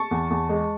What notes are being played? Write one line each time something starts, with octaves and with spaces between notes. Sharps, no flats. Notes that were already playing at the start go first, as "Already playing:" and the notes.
Already playing: A5 C#6
E2
E2
G#3